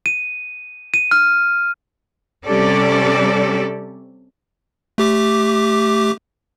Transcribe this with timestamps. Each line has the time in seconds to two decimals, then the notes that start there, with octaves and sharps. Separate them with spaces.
0.06 D#7
0.94 D#7
1.11 F6
2.46 C3 G3 C#4 G4 A4 D5
4.98 A3 G4 D6